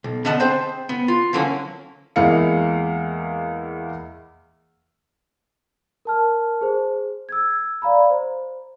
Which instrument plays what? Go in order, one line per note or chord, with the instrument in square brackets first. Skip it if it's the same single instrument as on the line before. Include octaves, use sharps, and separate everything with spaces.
[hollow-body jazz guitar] B1
D3 B3 D4 D#5 F#5 A5
C4 G#4 C5
B3
F4
D3 E3 F#3 A#3 C4 C#4
[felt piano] E2 G#3 A#3 E4 F5 C#7
[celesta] A#4 A5 F6
G#4 C5
E6 G#6
D5 F5 A#5 B5
C5